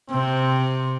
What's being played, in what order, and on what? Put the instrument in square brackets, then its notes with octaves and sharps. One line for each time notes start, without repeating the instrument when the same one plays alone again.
[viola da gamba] C3 [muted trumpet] C4